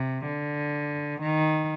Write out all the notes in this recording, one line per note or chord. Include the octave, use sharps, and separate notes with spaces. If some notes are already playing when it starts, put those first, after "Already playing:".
Already playing: C3
D3
D#3